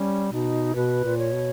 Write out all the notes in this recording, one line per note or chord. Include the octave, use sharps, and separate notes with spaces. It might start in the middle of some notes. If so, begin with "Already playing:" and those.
Already playing: G3 C#4
B2 D#4
B2 B4
A#2
C#5
B2